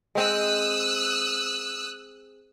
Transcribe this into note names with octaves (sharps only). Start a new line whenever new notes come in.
G#3 C4 D#6 E6 F#6